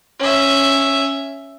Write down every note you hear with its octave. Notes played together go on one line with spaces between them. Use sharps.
C#4 E5